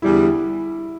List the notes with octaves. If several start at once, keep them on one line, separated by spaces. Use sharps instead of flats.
E2 D3 G3 E4